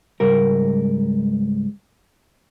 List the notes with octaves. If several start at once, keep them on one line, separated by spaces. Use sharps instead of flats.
C#2 G#2 G3 A#4